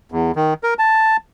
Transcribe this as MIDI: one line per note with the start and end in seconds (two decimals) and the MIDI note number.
0.12 0.32 40
0.36 0.54 51
0.63 0.74 70
0.79 1.17 81